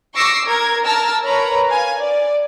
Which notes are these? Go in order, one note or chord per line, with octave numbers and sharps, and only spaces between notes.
C#6 D6 E6 A#6 C7
A#4 G#6
A#4 A5 E6 F6
A#4 B4 C#5 A#5 B5
F5 G#5
D5